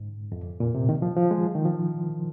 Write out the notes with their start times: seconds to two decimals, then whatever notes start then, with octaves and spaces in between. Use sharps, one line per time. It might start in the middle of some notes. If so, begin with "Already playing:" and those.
Already playing: G#2
0.32 F2
0.60 A#2
0.75 C3
0.89 D#3
1.02 F3
1.17 F3
1.31 G#3
1.55 D#3
1.65 F3